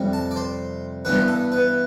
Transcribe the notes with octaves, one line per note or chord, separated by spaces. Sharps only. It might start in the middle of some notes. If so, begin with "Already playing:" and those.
Already playing: F2 C3 G3
A5
D5
C5
G2 E3 B3 D4 B4
A4
B4